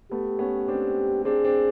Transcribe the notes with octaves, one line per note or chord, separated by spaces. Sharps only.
A3 B3 G4
B3 C#4
C4 D4
C4 D4 G#4
C4 D4